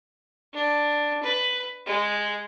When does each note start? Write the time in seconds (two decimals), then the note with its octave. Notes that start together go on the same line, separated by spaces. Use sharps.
0.54 D4
1.23 B4
1.86 G#3